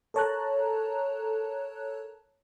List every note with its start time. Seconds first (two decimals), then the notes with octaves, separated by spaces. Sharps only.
0.14 A4 A#4 C#5 A5 A#5 F#6